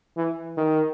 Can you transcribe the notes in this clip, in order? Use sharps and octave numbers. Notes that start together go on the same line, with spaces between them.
E3
D#3